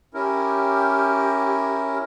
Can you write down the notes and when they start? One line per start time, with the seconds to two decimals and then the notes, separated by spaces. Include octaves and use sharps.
0.14 C#4 E4 G4 A#4